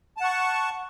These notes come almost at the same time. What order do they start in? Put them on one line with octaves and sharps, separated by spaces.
A5 F#5 C#6